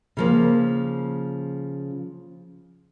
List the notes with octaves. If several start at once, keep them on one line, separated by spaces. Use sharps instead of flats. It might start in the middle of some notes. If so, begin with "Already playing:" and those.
C#3 F3 A#3